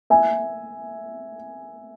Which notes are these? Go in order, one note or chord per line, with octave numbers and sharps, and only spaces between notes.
E5 G#5